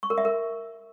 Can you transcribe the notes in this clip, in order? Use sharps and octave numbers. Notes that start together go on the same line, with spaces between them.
C#6
A#4
E5
A#4